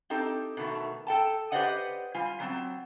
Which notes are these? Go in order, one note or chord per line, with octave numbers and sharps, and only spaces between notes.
C4 D#4 G4 A4
B2 D#3 A3
A4 G5 A5
G4 B4 C5 D5 D#5 F#5
G3 F4 G#5
F#3 B3 C4